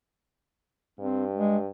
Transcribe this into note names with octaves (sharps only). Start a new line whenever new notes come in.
G2 C4
G#3